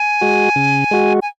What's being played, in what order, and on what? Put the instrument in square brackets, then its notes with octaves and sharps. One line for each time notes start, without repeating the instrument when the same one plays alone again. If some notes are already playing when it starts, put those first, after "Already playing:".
Already playing: [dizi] G#5
[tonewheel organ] G#3 F#4
C#3
G#3 F#4
[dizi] G#5